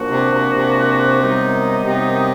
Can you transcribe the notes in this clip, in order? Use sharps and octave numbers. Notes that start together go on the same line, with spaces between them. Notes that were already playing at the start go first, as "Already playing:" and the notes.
Already playing: A#2 F3 A#3 D4 F#4
C3
C3
C3
F#2 D#3 G3 B3 D#4
C3